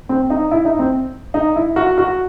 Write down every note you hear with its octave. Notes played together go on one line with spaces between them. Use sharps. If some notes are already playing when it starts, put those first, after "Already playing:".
C4
D#4
E4
D#4
C4
D#4
E4
F#4
F#4